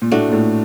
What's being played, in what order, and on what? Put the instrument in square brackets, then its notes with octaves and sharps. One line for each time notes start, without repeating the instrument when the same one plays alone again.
[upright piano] A#2
[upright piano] A2 [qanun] A3 D4 F#4
[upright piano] A#2
A2